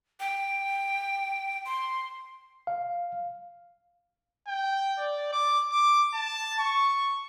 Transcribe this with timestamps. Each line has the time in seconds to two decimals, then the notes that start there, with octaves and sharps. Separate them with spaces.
0.20 G5
1.65 C6
2.67 F5
4.47 G5
4.98 D5
5.33 D6
5.72 D6
6.14 A5
6.59 C#6